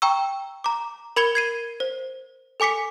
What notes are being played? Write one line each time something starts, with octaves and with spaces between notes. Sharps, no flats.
G5 A#5 C#6 E6
A#5 D6
A#4 B5 G#6 C#7 F7 G7
G#6 C7 D#7
C5
A4 G#5 D6 B6 C#7